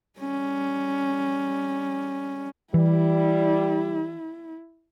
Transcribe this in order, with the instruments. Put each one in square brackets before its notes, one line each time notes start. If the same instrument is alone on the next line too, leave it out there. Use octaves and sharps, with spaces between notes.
[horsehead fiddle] G3 C#4
[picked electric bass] E3 [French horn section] G3 [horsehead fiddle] E4